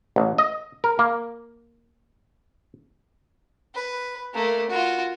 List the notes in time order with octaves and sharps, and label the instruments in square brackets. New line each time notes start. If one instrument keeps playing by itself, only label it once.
[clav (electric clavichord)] A1
D#5
A#4
A#3
[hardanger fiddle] B4
A3 A#3
F4 F#4